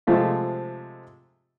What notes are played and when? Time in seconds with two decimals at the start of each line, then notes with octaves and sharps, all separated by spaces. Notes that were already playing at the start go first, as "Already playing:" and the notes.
0.07 C3 F3 G#3 A3 F4